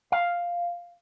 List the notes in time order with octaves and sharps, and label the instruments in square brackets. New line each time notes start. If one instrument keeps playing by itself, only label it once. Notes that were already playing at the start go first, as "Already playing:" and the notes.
[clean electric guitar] F5